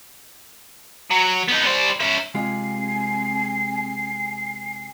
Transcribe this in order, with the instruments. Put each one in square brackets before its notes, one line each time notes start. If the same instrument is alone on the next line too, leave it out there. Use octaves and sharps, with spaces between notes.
[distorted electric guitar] F#3
B3 D#4
G3 C5
C#4 E5
[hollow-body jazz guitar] C3 G#3 F4 [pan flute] C4 [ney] G#5 [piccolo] C7